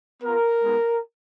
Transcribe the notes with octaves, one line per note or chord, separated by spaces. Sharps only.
B3 F4 A#4
G#3 B3 D#4